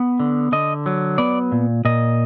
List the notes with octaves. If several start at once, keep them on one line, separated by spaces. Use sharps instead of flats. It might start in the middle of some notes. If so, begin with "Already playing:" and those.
Already playing: B3
D3
D3 D#5
F#3
B3 D5
A#2
A#2 D#5